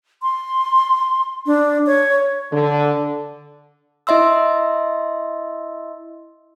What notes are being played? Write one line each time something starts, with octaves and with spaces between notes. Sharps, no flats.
C6
D4
C#5
D3
E4 D#5 E5 C6 E6